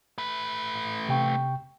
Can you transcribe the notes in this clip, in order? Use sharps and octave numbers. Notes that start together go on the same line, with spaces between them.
A3 B4
C3 G5 C#6